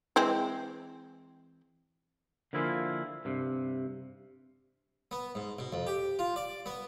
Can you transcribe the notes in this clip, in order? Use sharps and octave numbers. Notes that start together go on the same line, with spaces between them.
E3 G#3 C4
D3 F3 A#3 E4 F4 G#4
G2 C3
B3
G#2
B2
F2
G4
F4
D5
B3